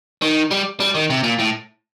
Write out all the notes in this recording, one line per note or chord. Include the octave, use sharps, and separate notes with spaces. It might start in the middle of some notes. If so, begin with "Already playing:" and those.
D#3
G3
G3
D#3
C3
A#2
A2